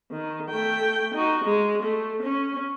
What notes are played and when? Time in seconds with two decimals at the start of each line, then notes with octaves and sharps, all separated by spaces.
0.11 D#3
0.50 A3 G5
1.15 D#4 F#4
1.45 G#3
1.83 A3
2.23 C#4